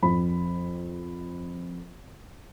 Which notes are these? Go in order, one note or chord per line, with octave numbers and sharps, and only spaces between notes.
F2 B5